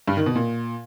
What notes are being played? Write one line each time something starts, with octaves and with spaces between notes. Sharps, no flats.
G2
D#3
B2
A#2